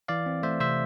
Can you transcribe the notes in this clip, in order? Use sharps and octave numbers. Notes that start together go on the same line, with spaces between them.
E3 D5 F5
C4
A3 C5 E5
C3 C5 E5